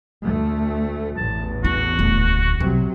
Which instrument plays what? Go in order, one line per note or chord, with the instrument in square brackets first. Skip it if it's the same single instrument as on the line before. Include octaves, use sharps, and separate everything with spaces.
[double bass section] D2 A3
[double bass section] A1 E2 [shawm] A5
[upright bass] E4 [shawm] F#4
[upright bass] D#1 D2
[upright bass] B1 [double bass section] C3 F#3